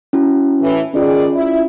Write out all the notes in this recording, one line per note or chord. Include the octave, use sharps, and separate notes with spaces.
C#4 E4 F#4
A2 E3
D#3 C#4 F4 G#4 D5
E4